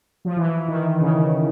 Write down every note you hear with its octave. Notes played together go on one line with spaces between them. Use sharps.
F3
E3
D#3
C#3